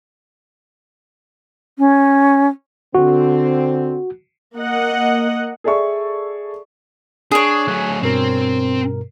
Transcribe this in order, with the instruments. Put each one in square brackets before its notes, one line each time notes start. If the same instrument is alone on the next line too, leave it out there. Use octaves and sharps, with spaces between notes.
[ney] C#4
[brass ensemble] D3 C4 [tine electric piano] F#4
[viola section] A#3 D#5 F#5
[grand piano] G#4 A4 D5 E5 C#6
[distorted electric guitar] D4 [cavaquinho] G#4 C#5 [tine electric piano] D#6
[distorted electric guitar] F#3 A3 [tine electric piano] G#5 F#6
[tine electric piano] G2 B2 A#4 [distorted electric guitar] C4